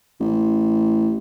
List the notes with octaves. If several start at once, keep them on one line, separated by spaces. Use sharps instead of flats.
A1